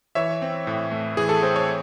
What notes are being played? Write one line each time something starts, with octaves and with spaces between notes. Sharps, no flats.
E3 C#5 E5
C4
A2
A3
E3 G#4
A4
C4 C5
C#5